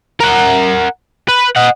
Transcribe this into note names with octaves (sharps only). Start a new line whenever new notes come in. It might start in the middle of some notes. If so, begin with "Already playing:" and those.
A#4 F#5
B4
D#5 F#5